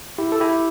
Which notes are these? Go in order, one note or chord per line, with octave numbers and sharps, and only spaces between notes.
E4 G4
A4
E4 G4